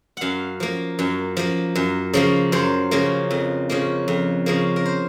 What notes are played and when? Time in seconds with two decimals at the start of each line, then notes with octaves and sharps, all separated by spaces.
0.17 F#2 F5 F#5
0.60 F3 A#3
0.99 F#2
1.37 F3 A#3
1.75 F#2
2.13 C#3 F3 A#3
2.52 F#2 C5
2.91 C#3 F3 A#3
3.31 F2
3.69 C#3 F3 A#3
4.08 F2
4.46 C#3 F3 A#3
4.76 A#4
4.86 C5